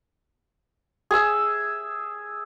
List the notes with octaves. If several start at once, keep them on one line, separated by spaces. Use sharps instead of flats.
G#4 E5